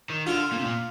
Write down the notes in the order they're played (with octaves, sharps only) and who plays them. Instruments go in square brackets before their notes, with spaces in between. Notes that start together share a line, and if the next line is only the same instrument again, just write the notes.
[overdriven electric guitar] D#3
[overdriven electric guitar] D3 [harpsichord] F4
[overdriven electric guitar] A#2
C3
A#2